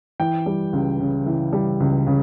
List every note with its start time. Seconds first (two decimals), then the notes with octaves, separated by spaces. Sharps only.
0.20 E3 G5
0.46 G3
0.73 C#2
1.00 C#3
1.26 E3
1.53 G3
1.80 C#2
2.07 C#3